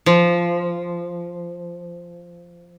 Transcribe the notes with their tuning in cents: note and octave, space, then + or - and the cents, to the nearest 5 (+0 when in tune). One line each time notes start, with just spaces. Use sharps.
F3 -10